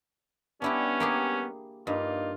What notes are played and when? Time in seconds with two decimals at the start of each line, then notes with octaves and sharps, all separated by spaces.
0.62 G3 B3 C#4 D4 E4 G4
1.00 A#3 G4 G#4
1.87 G2 A#3 D#4 F4